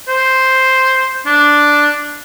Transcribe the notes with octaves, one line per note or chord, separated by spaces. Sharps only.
C5
D4